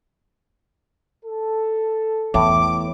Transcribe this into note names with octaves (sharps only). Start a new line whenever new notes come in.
A4
E2 A2 D6